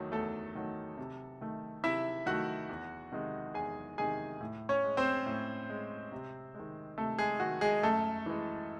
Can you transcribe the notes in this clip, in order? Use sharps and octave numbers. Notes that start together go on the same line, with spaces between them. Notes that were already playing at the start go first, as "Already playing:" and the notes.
Already playing: E2 D#3 F#3 A3
E2 A3 A4
D#3 F#3 A3
C3
D#3 A3
C3 E4 E5
D#3 A3 F#4 F#5
E2
C3 D#3 G#3
E2 G#4 G#5
C3 D#3 G#3 G#4 G#5
A2
C#4 C#5
G#3
C4 C5
A2
G#3
C3
D#3 G#3
C3 A3 A4
G#3 G#4
D#3 G#3 F#4
G#3 G#4
F#2 A3 A4
E3 G#3